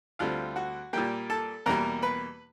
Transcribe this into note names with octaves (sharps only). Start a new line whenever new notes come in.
D2 D3 G3 C4 F4 F5
F#4 F#5
A#2 G3 A#3 G4 G5
A4 A5
E2 B2 G3 A#3 A#4 A#5
B4 B5